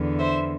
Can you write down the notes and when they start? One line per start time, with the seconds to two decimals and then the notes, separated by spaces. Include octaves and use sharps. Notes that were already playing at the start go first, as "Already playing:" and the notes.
Already playing: E2 D3
0.19 C5 E5